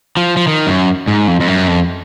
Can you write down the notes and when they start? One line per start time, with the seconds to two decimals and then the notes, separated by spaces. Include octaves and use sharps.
0.17 F3
0.37 F3
0.48 D#3
0.67 F#2
1.08 G#2
1.28 F2
1.40 F2
1.48 F#2
1.68 F2